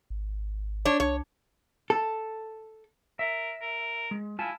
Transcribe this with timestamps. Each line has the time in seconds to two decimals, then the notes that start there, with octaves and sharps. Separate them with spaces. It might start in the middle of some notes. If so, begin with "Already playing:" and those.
0.10 G#1
0.85 D4 C#5
1.00 C2 C#5
1.90 A4
3.19 A#4 E5
3.61 A#4
4.11 G#3
4.39 E4 F4 G#5 A5